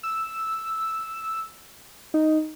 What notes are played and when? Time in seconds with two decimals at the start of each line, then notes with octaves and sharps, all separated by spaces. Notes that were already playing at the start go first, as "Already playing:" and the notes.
0.03 E6
2.14 D#4